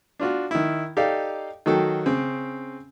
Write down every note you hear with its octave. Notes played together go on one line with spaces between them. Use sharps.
D4 F4 F#4
D#3 E4
D#4 G4 A4 D5 F5
D#3 F#3 F#4 A4 G5
C#3 C4